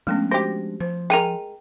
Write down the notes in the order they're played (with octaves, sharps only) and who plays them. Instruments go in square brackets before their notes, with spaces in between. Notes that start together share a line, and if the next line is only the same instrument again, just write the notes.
[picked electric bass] F3 G#3 D4 [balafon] A3 B3 C#4
[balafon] F#4 [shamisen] G4 C5 [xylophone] A#6
[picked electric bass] F3 [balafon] C5
[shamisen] G#3 A#4 [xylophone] G5 D#7 F7